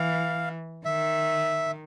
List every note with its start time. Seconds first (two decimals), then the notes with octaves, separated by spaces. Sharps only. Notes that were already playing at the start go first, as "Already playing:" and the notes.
Already playing: E3 F5
0.85 D#3 E5